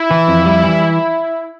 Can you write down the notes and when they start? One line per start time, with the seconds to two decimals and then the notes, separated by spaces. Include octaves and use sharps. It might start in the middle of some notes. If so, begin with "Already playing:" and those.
Already playing: E4
0.11 E3
0.28 F2
0.46 G3
0.63 E3